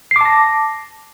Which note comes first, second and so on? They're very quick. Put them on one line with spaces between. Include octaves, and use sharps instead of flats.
C7 D6 A5 A#6